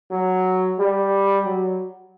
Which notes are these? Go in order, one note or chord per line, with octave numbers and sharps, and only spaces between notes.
F#3
G3
F#3